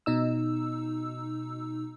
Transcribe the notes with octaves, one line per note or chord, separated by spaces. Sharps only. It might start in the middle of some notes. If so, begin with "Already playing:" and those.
B2 D#4 E6